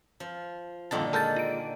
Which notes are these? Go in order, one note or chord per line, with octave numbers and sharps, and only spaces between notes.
F3
G1 F2 A#2 D3 D#3 A5
G#3 A4 A#4 A5 G6 A6
F4 D7